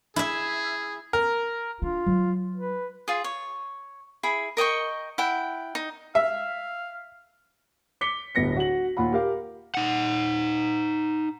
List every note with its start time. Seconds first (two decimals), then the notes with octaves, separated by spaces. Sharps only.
0.16 E4 G#4 E5
1.13 A#4
1.82 D4 F4
2.06 F#3
2.55 B4
3.08 F4 G#4
3.24 C#5
4.23 E4 G#4 B5
4.57 A#4 D#5 G5 C#6
5.18 E4 F#5 G5
5.75 D#4
6.15 E5 F5
8.01 D6 B6 C#7 G7
8.35 D1 G1 B3 A#6 C#7
8.57 F#4 F#7
8.97 D#2 A#2 F4 F#5 B5
9.12 G4 A#4 F5
9.75 D#4 F#5